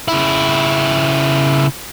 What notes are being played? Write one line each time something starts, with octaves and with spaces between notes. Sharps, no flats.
C#3 E4